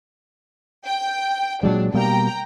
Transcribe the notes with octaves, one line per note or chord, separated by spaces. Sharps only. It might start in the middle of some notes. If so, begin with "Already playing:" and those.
G5
A#2 F#3 G#3 D4
B2 G3 A#3 G5 A#5